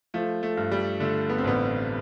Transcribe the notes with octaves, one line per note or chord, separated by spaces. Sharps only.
F3 A3
A3
G2
G3
D3 A3
B3
C4
A1 B3